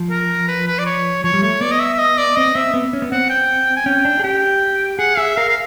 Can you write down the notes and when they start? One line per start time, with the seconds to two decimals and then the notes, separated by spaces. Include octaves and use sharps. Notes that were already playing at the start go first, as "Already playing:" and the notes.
Already playing: F3
0.10 A#4
0.48 B4
0.67 B4
0.79 D5
0.86 C#5
1.24 F3 C#5
1.34 G3
1.42 A3 C#5
1.61 B3 D5
1.71 D#5
1.80 E5
1.93 E5
1.98 D#5
2.18 D5
2.37 C4 D#5
2.55 C4 E5
2.74 B3
2.93 C#4
3.02 B3
3.12 C4 F#5
3.30 G5
3.77 G#5
3.86 C#4 G5
4.05 D4
4.20 G#4
4.24 G4 G5
4.99 G#4 F#5
5.17 G#4 E5
5.37 A#4 F5
5.49 F5